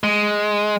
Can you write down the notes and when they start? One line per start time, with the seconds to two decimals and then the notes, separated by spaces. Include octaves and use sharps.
0.04 G#3